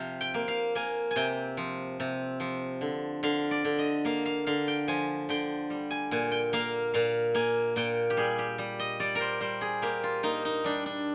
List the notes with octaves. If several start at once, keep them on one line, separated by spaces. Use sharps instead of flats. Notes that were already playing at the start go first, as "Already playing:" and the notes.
Already playing: C3 F3 F5
G5
A#3
F5
A#3 G#5
G#5
C3 G5
F3
C3
F3
D3
D3 F5
D5
D3
D#5
A#3 F5
F5
D3 F5
G5
F3 G#5
D3 G5
G3
G#5
A#2 G#5
G5
A#3 F5
A#2 F5
A#3 G#5
A#2 G5
G4
G3 G#4
G4
G3
D#5
G3 D5
A#4
C5
G3 C5
G#4
A#3 G4
F4
A#3 D#4
D#4
G3 D4
D4